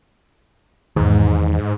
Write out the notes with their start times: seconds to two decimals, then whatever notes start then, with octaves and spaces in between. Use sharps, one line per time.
0.96 E2 G#2 D#3